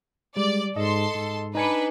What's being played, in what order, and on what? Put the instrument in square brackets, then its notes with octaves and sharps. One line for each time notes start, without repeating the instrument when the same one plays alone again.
[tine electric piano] G3 [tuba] G#3 [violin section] D5
[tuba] G#2 [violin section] A4 C6 [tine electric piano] D#5
[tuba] G#2
[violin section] D4 B4 [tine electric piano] D#4 G#5 C#7